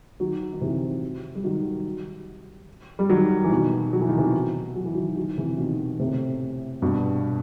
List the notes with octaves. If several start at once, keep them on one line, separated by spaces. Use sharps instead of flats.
D#3 F#3
D#3
C3 E3
G3
D#3 F#3
G3
D#3 F#3
E3
B2 D#3
F#3
E3
D#3
C3 E3
F#3
E3
D#3 F#3
D#3 F#3
C3 E3
B2 D#3
A2 C3
G2 B2